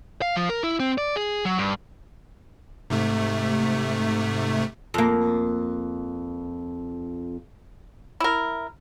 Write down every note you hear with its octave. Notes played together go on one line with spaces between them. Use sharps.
F5
F3
A#4
E4
C4
D5
G#4
F#3
G2
G#2 C3 A3
F2 A#3
E4 A#4